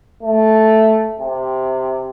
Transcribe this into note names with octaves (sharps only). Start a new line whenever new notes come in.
A3
C3